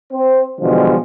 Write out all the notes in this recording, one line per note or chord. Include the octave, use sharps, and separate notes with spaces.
C4 C5
B2 D3 E3 F3 G3 G#3